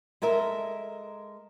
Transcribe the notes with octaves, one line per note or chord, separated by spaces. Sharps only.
G#3 A4 A#4 E5